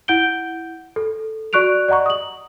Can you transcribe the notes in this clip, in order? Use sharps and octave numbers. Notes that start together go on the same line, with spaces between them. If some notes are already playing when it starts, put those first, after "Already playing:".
E4 F#5 G6 D7 G7
A4
F#4 D5 C#6 F#6 D7 F7
D5 D#5 F#5 A#5 C#6
D#6 F#7